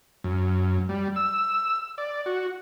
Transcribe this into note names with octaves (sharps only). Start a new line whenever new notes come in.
F#2
G3
E6
D5
F#4